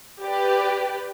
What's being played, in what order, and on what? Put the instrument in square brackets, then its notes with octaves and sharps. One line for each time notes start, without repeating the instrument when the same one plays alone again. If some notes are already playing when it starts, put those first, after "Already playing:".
[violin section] G4 B4 D5